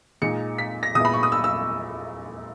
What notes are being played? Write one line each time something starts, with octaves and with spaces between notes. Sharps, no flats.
A#2 G#3 D#4 C#7
B6
A#6
A#2 G#3 B3 E4 D#6
B5
C#6
D#6
E6
E6